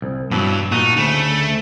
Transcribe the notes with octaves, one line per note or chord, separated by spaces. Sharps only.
C2
G2 B2 E3 F#3
A#2 A3 D#4 F#4
D2 C#3 A3